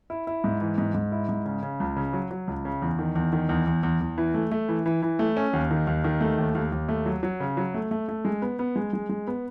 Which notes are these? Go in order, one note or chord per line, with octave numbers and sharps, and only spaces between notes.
E4
E4
G#2
E3
G#2
G#2
E4
G#2
C#3
C#3
C#2
C#3
F#3
F#3
C#2
C#3
E2
D#3
E2
D#3
E2
E2
E2
E2
E3
A3
A3
E3
E3
E3
A3
C#4
D#2
D#3
D#2
D#3
A3
D#2
D#2
D#2
A3
F#3
F#3
C#3
F#3
A3
A3
A3
G#3
B3
B3
G#3
G#3
G#3
B3